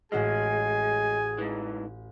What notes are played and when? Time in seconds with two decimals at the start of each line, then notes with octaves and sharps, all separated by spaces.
0.12 A1 G#3 F#4 G#4 G#5 F6
1.38 G#2 E3